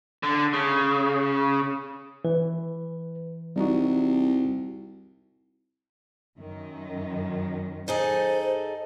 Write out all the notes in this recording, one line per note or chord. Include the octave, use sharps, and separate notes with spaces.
D3
C#3
E3 B4
C2 G3 D#4 F#4
F#2 D#3
D#4 G#4 A4 C5